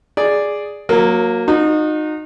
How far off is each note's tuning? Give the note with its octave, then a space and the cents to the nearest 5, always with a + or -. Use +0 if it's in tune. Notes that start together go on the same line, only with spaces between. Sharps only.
G#4 +0 D5 +0
F#3 -20 A#3 +0
D#4 -20 F#4 -45